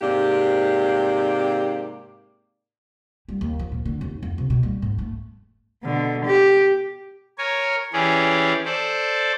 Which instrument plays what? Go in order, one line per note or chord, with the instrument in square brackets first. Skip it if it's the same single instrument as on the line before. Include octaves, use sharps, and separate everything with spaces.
[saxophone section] G#2 C3 A#3 G4 D5
[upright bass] G3
D#2
F3
A#2
D3
D#2
F2
C3
B2
G3
G#2
A3
[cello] B2 D3
G4
[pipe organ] A#4 C#5 G#5
E3 C#4 G4 G#4 D5
A4 C5 D5